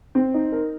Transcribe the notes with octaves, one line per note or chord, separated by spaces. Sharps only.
C4
D#4
A#4